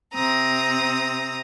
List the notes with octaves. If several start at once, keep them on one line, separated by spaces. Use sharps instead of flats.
C3 C4 A#5 D#6